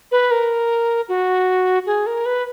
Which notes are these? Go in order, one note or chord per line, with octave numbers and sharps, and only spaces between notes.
B4
A#4
F#4
G#4
A#4
B4